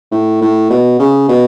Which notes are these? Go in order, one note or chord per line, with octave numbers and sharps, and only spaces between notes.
A2
A2
B2
C#3
B2